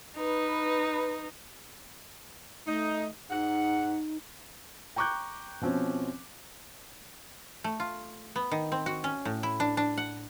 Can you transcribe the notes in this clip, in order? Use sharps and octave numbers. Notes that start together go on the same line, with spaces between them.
D#4 B4
A3 D#4
G#2 D#4 F#5
G5 A#5 C#6 D6 F#6 G6
B2 F3 C4 C#4
A3
F4
B3
D#3
C4
F#4
C#4
A2
E4
D4
D4
F#5